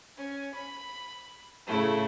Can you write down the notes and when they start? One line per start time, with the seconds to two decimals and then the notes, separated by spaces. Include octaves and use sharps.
0.16 C#4
0.54 B5
1.66 A2 C#3 A3 E4